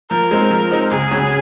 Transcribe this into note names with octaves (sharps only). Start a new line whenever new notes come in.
F3 A#4
G#3 C4 D#4
F3
G#3 C4 D#4
C#2 G#4
C#3 F#3 C#4 F#4